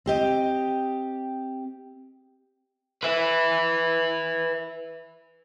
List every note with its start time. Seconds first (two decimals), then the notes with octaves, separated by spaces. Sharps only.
0.06 C4 G4 D#5
3.03 B4 E5